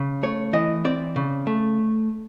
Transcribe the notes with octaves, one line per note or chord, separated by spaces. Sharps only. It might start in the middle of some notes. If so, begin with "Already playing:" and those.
Already playing: C#3
A3 C#5
E3 D#5
C4 D5
C#3
A3